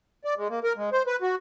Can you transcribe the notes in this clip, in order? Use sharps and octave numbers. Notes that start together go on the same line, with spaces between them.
D5
G#3
A#3
A#4
G#3
C5
B4
F#4